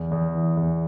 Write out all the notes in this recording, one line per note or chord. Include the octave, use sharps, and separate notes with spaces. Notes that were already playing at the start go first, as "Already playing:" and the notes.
Already playing: E2
E2
E3
E2